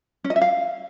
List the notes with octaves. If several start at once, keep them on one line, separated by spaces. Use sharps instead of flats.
C#4
D#5
E5
F5